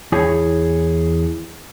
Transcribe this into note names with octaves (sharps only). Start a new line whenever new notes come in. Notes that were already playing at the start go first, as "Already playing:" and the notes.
E2 E4 G#4 C#5 G#5